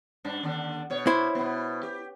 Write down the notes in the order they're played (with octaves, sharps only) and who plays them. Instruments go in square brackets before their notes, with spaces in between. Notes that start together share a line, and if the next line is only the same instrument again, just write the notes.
[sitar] G2 D4
D#2 D3 D4
B2 C#5
[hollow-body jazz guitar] E4 C5
[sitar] B2 B3
G4